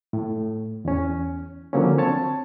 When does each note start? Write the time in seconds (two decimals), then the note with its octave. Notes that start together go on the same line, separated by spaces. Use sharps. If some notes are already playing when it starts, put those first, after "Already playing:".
0.13 A2
0.85 E2 C#4
1.73 D3 F3 F#3 A#3 C4 C#4
1.98 C4 C#5 A5